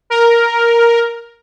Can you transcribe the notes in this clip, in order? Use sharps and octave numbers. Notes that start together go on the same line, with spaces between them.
A#4